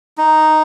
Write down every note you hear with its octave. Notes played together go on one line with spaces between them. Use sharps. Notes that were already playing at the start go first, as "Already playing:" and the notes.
D#4